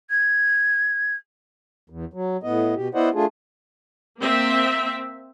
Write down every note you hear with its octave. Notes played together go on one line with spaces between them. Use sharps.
G#6
E2
F#3
A2 B3 D#5
B2 G4
B3 E4 C5 D5 D#5 F#5
A3 D4 F4 G#4
A#3 C4 E5